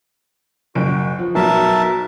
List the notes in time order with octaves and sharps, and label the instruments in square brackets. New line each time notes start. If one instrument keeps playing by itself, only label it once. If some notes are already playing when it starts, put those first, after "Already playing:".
[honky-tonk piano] F#1 D7 [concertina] F#4
[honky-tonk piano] F3
[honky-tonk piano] B1 B2 [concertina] A#4 E5 A5